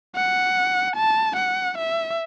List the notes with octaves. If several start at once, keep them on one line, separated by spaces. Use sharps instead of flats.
F#5
A5
F#5
E5